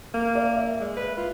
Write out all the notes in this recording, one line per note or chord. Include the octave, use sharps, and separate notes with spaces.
A#3
D5
E5
G#3
B4
F4